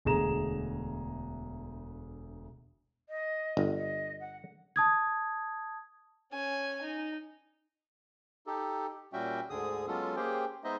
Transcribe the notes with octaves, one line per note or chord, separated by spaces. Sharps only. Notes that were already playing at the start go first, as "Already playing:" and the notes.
E1 D2 B2 G#4 A#5 E7
D#5
G1
D#5
F#5
A5 D#6 G#6
C#4 G#5
D#4
D#4 G4 A4
A#2 G3 C#4 F#4 E5 G5
D2 G#2 D3 G#4 D#6
F#3 G#3 B3 C#4 F4 A4
A#3 C#4 G4 G#4 C5 G5
G#3 B3 D#4 C5 D#5 E5